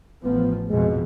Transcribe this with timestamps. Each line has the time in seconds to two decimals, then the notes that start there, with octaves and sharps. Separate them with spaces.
0.25 A1 F3 B3
0.70 F2 B2 G#3